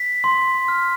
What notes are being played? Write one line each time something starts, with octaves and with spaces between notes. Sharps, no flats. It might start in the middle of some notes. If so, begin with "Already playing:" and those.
Already playing: B6
C6
F6